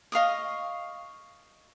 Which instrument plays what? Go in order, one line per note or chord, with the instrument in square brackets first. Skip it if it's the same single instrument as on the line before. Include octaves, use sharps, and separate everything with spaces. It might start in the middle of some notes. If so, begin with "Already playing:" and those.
[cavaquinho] D#5 F5 C#6 D#6